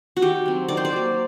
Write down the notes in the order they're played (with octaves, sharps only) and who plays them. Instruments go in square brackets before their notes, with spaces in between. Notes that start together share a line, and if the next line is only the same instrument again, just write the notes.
[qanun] F#4
D#3 G4
F#3 C4
D#3 D5
C5
D5
F#3 A#3